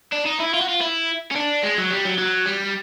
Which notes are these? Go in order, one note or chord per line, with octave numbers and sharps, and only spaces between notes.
D4
D#4
E4
F4
F#4
F4
E4
C#4
D4
G#3
F#3
G3
F#3
F#3
G3